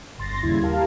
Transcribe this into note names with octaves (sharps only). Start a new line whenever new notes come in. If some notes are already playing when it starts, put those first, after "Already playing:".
G1 C6 A6 A#6
D#2 C#3 G3 E4 G#6
G4 A#4 F5 A5